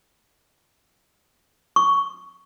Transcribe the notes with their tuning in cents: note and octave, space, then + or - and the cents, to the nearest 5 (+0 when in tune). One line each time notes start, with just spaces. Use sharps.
C#6 +10